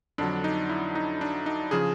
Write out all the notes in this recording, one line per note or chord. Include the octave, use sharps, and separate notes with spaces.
F2 D3 F#3 D4
D#4
E4
D#4
D4
D#4
C#3 F3 G#4